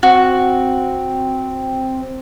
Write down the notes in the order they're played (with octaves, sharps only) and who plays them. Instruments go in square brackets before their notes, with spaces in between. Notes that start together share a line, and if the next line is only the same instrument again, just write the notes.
[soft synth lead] C4 [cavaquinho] F#4